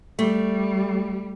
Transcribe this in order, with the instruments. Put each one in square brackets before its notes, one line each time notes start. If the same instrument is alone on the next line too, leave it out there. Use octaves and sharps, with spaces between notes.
[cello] G3 [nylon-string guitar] A3